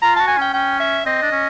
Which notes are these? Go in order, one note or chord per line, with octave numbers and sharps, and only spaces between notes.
F4 A#5
F#4 A5
G#5
C#4 G5
C#4 G5
E5
C4 D#5
D4
C#4